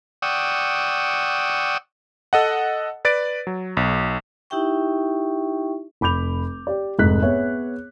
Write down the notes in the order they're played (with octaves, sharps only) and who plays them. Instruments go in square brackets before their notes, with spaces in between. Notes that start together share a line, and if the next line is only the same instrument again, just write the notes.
[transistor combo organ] D5 F#5 G5 C#6 D#6 E6
[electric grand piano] A4 D#5 F#5
B4 D5 A6 D7
F#3
B1
[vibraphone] D#4 E4 G4 E5 G5 C#6
[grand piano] F1 B5 D6 G6 F7
G4 D5
F1 G#2 F#6 B6
B3 G#4 C#5 E5